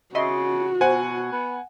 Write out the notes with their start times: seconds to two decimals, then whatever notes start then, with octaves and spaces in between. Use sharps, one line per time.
0.15 C#3 F#4 D#5 E5 C6
0.81 B2 C5 F#5 G#5
1.32 B3